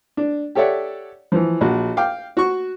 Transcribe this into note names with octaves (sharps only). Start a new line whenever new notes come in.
D4
G4 A4 C#5 D5 E5 F#5
E3 F3
A#1 F#4
F5 G5 D6
F#4 C#6